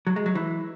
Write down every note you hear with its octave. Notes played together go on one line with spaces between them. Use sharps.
F#3
G#3
F#3
E3